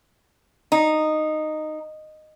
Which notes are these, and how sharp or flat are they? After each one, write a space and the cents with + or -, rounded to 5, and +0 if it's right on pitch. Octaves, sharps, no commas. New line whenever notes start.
D#4 -10